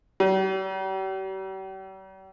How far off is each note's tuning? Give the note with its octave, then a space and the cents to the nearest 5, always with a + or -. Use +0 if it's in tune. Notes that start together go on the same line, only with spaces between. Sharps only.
G3 -45